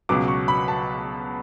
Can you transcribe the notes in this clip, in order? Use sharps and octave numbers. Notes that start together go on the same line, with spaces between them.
C#2 B2 F#3 B3 D6
C#6
B5
A5